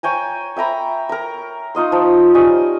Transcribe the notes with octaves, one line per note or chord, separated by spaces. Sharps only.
C#5 G5 G#5 A#5
E5 G5 A#5 B5
A#4 A#5
D#4 F4 D#5 C6
F3
G3 C#4 D#5 G#5